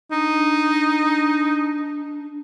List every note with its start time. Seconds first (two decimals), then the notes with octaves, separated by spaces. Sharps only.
0.12 D4 D#4